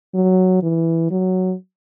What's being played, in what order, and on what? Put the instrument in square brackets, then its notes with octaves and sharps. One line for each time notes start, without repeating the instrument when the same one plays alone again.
[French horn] F#3
E3
F#3